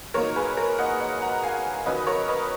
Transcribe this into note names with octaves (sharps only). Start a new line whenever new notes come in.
A#2 F#3 A#3 D#4 A#4 C#5
G#4 B4
A#4
D#5 F#5
D#5 F#5
F#5 A#5
F5 G#5
D#3 F#3 C#4 B4 D#5
A#4 C#5
B4 D#5